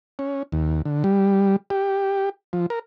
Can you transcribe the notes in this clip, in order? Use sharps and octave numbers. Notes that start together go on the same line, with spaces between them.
C#4
D#2
D3
G3
G4
F3
A#4